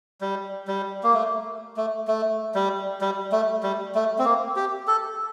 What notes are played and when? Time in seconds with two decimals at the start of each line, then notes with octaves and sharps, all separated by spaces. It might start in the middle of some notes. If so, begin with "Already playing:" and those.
0.21 G3
0.68 G3
1.03 A#3
1.14 A3
1.77 A3
2.08 A3
2.55 G3
3.01 G3
3.32 A3
3.63 G3
3.95 A3
4.19 C4
4.25 A#3
4.56 G4
4.87 A4